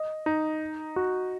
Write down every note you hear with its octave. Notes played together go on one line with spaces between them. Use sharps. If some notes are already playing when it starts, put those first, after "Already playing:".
Already playing: D#5
D#4
F#4